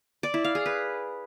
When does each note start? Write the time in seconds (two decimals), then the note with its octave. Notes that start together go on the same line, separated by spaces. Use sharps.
0.23 D5
0.34 E4
0.44 F5
0.55 G#4
0.66 B4